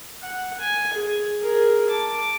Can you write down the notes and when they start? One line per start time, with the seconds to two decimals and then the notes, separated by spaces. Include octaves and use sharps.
0.22 F#5
0.60 G#5
0.93 G#4
1.40 G#4 A#4
1.90 A5 D6